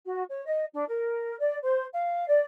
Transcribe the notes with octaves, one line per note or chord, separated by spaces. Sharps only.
F#4
C#5
D#5
D4
A#4
D5
C5
F5
D5